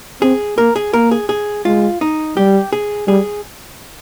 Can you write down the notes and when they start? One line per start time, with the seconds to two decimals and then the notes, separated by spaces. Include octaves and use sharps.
0.22 C4 G#4
0.58 A#3 A#4
0.76 G#4
0.93 A#3 A#4
1.11 G#4
1.29 G#4
1.65 G#3 F4
2.01 D#4
2.37 G3 G4
2.73 G#4
3.08 G3 G#4